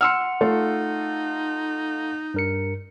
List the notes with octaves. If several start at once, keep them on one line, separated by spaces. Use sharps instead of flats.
F#5 C6 E6 F6 C#7
A3 D#4 F4 A4
G2 A#4 C#7